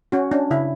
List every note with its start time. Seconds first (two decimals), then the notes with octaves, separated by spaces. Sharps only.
0.12 C#4 F#4
0.31 C#4 D4
0.51 C#3 E4